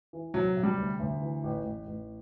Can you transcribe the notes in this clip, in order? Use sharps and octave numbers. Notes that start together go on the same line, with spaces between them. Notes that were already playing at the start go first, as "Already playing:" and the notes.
E3
C3 F#3
C3
G3
D2
D2
E3
A1
A1
A1